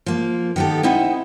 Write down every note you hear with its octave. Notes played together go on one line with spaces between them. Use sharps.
F3 A#3
D#3 B3 F#4 G4 A4
C4 D#4 E4 D#5 E5 F#5